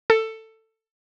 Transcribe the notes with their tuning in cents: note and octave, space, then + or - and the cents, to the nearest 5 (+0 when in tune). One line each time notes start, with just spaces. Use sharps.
A4 +15